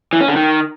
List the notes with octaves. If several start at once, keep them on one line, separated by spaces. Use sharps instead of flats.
E3
C#4
D3
D#3